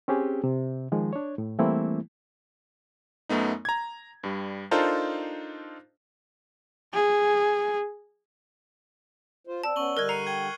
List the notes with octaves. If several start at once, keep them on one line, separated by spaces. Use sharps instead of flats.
C4 C#4 G4 G#4
C3
D#3 F3 G#3
D4 C#5
A2
E3 G3 A3 A#3 C4 E4
F#2 A3 B3 D#4
A#5 G#6
G2 G3
D4 D#4 F4 A4 A#4 C5
G#4
F4 C5
C4 D5 A5 E6
B3 C#4 C#6 F#7 G7
D3 G3 A#4 D#5 F6 F#6 G#6
A#5 C7 C#7 D#7
G5 G#6 G7